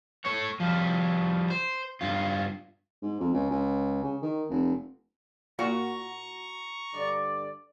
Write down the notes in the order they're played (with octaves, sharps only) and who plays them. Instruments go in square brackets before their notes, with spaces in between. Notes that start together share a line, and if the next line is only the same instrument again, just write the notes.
[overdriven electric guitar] A3 C#5
F3 G3
C5
G2 F4
[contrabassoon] G#2
F2
C#2
C#2
C#3
D#3
F1
[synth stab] A#2 [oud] F#4 [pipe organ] A#5 C#6
[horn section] G2 D3 D5